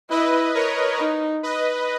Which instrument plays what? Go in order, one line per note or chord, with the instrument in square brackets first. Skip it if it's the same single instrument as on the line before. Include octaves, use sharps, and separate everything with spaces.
[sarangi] E4 [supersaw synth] B4 D#5
[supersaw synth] A#4 C#5
[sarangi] D#4
[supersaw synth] B4 D#5